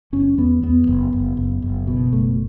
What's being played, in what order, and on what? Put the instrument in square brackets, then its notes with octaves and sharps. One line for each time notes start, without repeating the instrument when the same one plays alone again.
[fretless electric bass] F#1 C#4
E2 B3
E2 B3
F#1
F#1
F#1
F#1
B2
F#1 A3